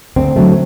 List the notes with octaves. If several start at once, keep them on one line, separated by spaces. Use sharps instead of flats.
D2 C4
D3 F#3 A3